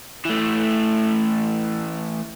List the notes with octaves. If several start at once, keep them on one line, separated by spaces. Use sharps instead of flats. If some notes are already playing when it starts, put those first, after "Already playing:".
E3 A3